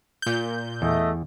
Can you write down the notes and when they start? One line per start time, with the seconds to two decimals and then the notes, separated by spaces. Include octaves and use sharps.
0.22 A#2 G6
0.82 E2 A3 D#5 E5